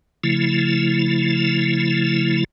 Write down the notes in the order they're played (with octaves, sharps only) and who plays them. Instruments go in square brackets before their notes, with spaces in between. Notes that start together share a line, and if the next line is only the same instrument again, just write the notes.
[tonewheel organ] C#3 F3 A3 E4